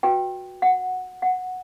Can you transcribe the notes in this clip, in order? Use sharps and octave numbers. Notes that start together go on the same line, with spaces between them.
F#4 B4 G5
F#5
F#5